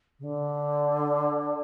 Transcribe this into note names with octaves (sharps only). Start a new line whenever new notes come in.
C#3
D3